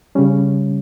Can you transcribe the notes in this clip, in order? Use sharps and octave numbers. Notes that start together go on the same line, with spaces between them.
C#3 G3 C#4